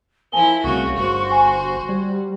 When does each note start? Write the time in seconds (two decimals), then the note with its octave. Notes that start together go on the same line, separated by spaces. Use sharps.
0.32 F3 E4 A#4 G#5 A5 G7
0.64 C2 C#3 A3 F#4 A#4 C#6
0.97 G1 F#4 G#4 C5
1.30 G5 G#5
1.89 G3 D5